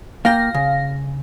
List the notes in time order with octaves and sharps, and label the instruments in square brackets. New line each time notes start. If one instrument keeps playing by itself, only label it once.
[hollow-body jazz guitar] A#3 F4 G5 [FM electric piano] F5 A#6
[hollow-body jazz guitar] C#3